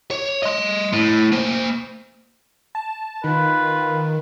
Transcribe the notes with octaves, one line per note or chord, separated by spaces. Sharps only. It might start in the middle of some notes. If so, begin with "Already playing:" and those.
C#5
D#5 C6
A2
A#3 C5
A5
D#3 F4 B4